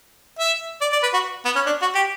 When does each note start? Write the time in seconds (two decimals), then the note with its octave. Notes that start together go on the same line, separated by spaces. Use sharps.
0.39 E5
0.81 D5
0.92 D5
1.03 B4
1.14 F#4
1.45 B3
1.56 C#4
1.66 D4
1.82 F#4
1.95 G4